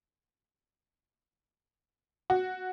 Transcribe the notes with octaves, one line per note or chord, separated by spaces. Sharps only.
F#4